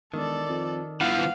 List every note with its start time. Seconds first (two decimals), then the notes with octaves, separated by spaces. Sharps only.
0.14 E1 D#3 A4 D5
0.49 F2
1.01 G1 E3 F3 F5 F#5